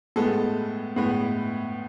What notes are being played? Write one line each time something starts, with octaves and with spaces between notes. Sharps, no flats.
A2 G#3 B3 A4
A2 G#3 B3